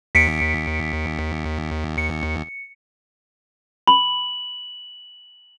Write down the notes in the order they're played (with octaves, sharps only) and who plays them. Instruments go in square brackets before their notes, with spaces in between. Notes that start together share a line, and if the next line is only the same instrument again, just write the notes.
[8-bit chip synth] D#2 [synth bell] B6 C#7 D7
[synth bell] C#7
[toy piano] B5 [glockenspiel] F#7